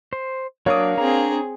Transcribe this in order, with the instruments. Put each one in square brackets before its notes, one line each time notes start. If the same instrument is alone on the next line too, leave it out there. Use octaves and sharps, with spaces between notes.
[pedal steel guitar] C5
[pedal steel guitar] F#3 D4 D6 [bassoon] A#3 [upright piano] C#5 D#6
[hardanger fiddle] C4 G#4 [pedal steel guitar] D4 A#5